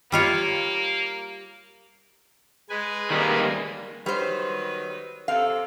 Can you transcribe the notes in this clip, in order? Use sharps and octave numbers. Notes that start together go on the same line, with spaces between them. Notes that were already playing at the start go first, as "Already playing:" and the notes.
G3 A#3 F4 C#5
G#3 B4 G#5
D#3 G3 A#3
D#3 F#3 G3 B4 C5
C3 C4 A4 F5